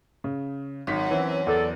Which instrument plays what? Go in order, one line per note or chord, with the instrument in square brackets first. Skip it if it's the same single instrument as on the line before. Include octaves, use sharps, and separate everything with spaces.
[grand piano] C#3
[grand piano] G#1 B6 [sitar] F#2
[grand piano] E3 C4 C#4
[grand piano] E2 [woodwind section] A4 D5